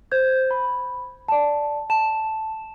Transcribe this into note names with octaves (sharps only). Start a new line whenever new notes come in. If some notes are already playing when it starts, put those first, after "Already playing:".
C5 G6 G#6
B5
D5 A5
A5 E7